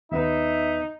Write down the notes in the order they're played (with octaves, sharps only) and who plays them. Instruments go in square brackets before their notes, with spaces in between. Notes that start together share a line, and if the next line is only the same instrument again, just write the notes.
[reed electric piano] D#2 B3 B4 [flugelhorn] D#4 [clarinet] E5